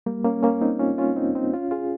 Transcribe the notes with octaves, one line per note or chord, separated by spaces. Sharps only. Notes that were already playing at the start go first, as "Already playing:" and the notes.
G3 A#3
A#3 C#4
A#3 C#4
C4 D#4
C#4 F4
C#4 F4
C4 D#4
C4 D#4
C#4 F4
F4 G#4